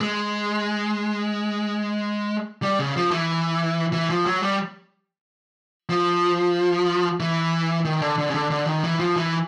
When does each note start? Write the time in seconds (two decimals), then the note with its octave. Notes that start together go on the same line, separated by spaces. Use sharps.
0.01 G#3
2.63 G3
2.79 C#3
2.96 F3
3.11 E3
3.93 E3
4.10 F3
4.26 F#3
4.43 G3
5.90 F3
7.20 E3
7.85 D#3
8.02 D3
8.18 D3
8.30 C#3
8.34 D3
8.51 D3
8.67 D#3
8.84 E3
9.00 F3
9.16 E3